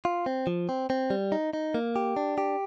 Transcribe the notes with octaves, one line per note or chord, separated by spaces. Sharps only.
F4
C4
F3
C4
C4
G3
D#4
D#4
A#3
G4
D4
G4